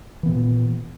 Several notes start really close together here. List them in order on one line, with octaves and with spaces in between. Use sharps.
E3 B3 A#2